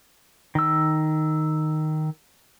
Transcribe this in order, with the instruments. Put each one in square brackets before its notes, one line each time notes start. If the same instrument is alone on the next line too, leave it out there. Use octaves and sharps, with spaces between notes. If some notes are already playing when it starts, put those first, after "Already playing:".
[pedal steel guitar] D#3 E6